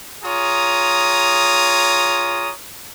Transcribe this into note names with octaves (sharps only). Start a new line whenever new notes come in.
F4 G#4 C#5 A#5 D#6